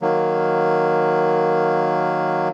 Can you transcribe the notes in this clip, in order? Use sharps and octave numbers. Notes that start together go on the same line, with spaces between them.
D#3 F#3 A#3